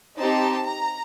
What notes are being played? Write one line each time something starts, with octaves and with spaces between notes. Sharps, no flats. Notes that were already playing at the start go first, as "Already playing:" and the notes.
C4 D#4 G4 A5
A#5